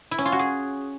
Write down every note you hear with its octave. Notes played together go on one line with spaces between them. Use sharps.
E4
C#4
F4
F#4
G#4